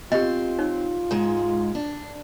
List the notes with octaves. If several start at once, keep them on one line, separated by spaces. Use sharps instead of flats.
C4 F4 G4 D#5
D#4 C#5
G#2 G#3
D4